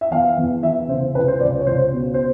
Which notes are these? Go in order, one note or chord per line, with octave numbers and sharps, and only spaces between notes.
E5
E2 F5
E2
E3 E5
C#3 C5
C#2 B4
C5
C#2 D5
C#5
C#2 C5
B2
C5